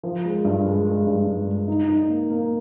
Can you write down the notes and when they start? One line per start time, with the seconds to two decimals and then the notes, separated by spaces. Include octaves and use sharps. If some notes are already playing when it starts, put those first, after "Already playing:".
0.03 F3
0.25 G#3
0.45 G2
0.65 G#3
0.85 G#3
1.06 G2
1.27 G2
1.47 G#3
1.68 D#4
1.88 D#4
2.08 A#3
2.30 A#3